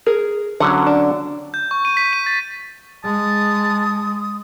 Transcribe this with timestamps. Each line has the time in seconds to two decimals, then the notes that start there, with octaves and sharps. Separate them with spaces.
0.06 G#4 A#4
0.60 D3 F#3 C#4 F#5
0.86 D4
1.54 G6
1.71 C#6
1.85 D#7
1.97 B6
2.13 D#7
2.26 A6
3.04 G#3 A5 D#6